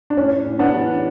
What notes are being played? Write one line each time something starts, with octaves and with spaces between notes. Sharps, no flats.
D4
A2 C#4
A2
B3 D4
E3